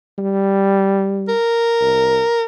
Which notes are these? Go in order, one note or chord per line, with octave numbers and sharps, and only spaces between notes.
G3
A#4
C2